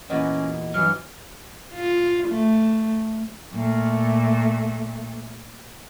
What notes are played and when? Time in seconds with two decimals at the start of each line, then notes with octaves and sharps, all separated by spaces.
0.10 E2 A#2 A#3 C#4 F#4 B4 D#5
0.74 G2 E3 F#3 F6
1.73 F4
2.27 A3
3.53 A#2 A3